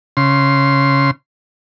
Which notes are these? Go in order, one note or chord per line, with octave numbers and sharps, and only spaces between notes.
C#3 C6